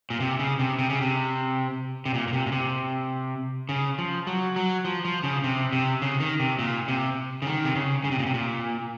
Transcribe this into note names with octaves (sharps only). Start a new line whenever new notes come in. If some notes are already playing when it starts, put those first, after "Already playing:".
A#2
C3
C#3
C3
C3
C#3
C3
C3
A#2
A#2
C3
A#2
C3
C#3
F3
F#3
F#3
F3
F3
C#3
C3
C3
C#3
D#3
C3
A#2
C3
C#3
D#3
C3
C#3
C#3
C3
A#2
C3
A#2